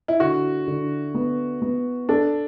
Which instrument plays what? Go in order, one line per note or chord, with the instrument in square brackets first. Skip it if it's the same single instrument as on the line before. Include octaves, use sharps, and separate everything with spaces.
[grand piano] E4
[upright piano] D3 [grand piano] F#4
[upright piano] D3
B3
B3
[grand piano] D4 [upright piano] A4